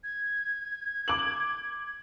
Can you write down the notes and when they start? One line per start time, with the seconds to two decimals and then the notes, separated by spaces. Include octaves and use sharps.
0.04 G#6
1.08 D6 F#7